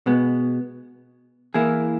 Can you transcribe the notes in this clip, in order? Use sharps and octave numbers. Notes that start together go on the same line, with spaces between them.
B2 G#3 B3
E3 A#3 E4 G#4